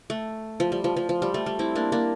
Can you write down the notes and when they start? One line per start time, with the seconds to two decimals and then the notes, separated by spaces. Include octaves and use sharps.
0.10 A3
0.60 F3
0.72 G3
0.84 F3
0.97 F3
1.09 F3
1.22 G3
1.34 A3
1.46 G3
1.59 C4 E4
1.75 A#3 D4
1.92 A#3 D4